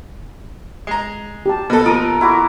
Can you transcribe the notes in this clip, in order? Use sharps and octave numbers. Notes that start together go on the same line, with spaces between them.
G#3 A#5
G4 A5
B2 A4
F4 A#4 D#6
E4 F#4 D6